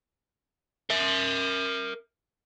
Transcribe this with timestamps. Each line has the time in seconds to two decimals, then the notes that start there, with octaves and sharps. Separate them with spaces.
0.90 A#4 E5